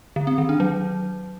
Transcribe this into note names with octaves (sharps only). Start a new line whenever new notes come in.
D3
C4
D#3
D4
F#3